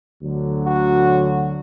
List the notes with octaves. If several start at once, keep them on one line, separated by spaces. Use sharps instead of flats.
D2 D3 F#3
F#4